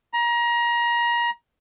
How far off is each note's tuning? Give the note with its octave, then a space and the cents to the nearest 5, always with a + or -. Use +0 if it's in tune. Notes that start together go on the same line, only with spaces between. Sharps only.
A#5 +30